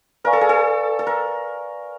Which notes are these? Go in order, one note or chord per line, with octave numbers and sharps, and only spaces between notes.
A#4 B4 D5 F5 G#5 C#6
A4
G#4
A4
A4
A#4